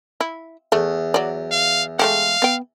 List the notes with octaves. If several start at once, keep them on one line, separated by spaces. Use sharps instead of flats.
E4
E2 A3
F#3 D5
F5
G#3 A3 G4 F5
B3 G5